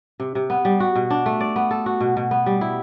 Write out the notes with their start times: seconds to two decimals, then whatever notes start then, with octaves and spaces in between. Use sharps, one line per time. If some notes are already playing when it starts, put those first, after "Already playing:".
0.20 C3
0.35 C3
0.50 B3
0.65 G3
0.80 F#4
0.95 B2
1.10 D4
1.26 A3
1.40 D5
1.56 B3
1.71 A4
1.86 F#4
2.01 B2
2.17 B2
2.31 B3
2.46 G3
2.61 E4